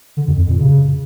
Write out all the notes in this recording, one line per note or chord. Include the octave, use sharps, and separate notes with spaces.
D3
F2
F2
A#2
C#3